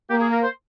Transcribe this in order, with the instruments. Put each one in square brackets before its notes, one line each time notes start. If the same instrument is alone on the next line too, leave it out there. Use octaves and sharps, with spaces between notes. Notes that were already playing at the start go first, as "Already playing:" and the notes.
[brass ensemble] A#3 [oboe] G4
[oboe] G#4
A#4
C5